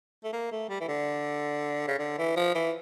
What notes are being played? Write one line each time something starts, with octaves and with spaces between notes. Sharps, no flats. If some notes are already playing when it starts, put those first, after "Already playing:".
A3
A#3
A3
G3
E3
D3
C#3
D3
E3
F3
E3